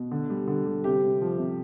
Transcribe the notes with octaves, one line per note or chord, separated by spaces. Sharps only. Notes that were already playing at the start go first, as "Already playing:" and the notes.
Already playing: B2
D3
G3
D3
G3
C3 G4
C3
F3
C3